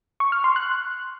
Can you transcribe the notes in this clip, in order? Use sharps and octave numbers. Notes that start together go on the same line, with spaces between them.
C#6
F6
C6
F#6